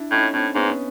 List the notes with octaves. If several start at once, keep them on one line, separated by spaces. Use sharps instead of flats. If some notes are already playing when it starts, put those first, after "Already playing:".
Already playing: D4 E4
A2 C#4 D#4
A2 C4 D4
G#2 B3 C#4
C#4